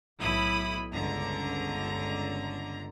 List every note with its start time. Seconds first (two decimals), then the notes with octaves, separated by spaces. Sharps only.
0.19 B1 A2 E4 B5 D#6
0.93 G1 C#2 D3 A#5